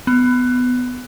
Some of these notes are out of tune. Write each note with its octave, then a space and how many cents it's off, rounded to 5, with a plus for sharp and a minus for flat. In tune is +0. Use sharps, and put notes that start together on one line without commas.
B3 +15